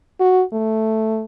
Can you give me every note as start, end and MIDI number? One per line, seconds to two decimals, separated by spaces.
0.20 0.43 66
0.53 1.24 57